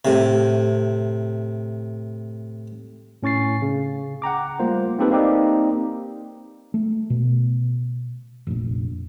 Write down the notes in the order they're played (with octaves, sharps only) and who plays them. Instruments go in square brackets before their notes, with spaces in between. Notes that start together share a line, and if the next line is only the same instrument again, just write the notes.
[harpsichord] A2 C3
[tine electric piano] A2 C#4 C#6 A6 C7
C#3
F#5 G5 A#5 D6
G3 A3 A#3 F4 C5
A#3 C4 D#4 G4 A4 B4
A#3 C4 D#4 G4 D5
[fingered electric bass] A3
B2
F1 A#1